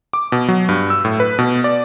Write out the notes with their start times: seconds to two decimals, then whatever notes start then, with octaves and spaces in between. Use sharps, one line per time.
0.13 D6
0.32 B2
0.48 F#3
0.69 G2
0.90 E6
1.05 A2
1.20 B4
1.39 B2
1.64 D5